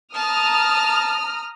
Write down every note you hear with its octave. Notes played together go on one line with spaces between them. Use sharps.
A5 A#5 D#6 F6